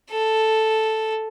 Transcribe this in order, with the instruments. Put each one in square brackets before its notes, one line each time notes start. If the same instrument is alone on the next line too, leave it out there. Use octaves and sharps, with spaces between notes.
[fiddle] A4